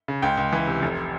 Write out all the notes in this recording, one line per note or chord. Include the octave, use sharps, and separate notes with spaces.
C#3
C#2 G5
C#2
E3
C3
F1